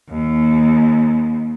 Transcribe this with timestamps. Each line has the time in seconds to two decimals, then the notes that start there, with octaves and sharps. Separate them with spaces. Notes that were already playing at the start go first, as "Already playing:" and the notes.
0.10 D#2